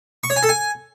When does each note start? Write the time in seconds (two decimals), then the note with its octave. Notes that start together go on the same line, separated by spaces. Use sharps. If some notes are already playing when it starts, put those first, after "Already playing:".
0.24 C#6
0.30 C#5
0.36 G#5
0.43 A4
0.49 G#5